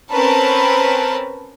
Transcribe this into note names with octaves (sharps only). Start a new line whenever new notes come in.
C4 C#4 A#4 B4 A5